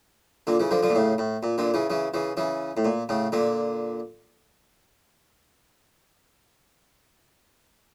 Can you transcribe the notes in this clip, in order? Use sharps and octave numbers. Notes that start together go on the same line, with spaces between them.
A#2 D3
C#3 E3
D3 F3
D3 F3
A#2
A2 C#3
A2
A#2
A#2 D3
C#3 E3
C#3 E3
C#3 E3
C#3 E3
A2
A#2
A2 C#3
A#2 D3